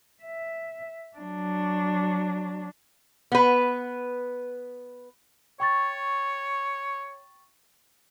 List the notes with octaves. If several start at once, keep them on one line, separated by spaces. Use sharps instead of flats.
E5
F#3 D4
B3 B4
C#5 G5 C#6 A6